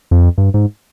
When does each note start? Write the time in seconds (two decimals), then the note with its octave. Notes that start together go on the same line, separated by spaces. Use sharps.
0.11 F2
0.38 G2
0.54 G#2